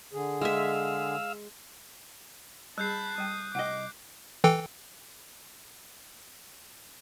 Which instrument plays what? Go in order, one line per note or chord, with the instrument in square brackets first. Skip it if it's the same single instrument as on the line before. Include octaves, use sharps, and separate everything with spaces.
[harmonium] D3 G#4
[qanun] G#3 E5 [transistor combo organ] F5 E6
[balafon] G3 G#4 [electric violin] A5 B5 [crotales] F#6 G6 C7
[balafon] G3 G5 [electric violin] D#6
[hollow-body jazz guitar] C2 D#5 [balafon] F#5 G5 [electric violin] D6
[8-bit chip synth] E3 A4 G5